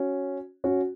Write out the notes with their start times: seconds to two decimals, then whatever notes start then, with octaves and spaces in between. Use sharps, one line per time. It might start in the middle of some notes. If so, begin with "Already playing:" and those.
Already playing: C#4 F#4
0.64 C#4 F#4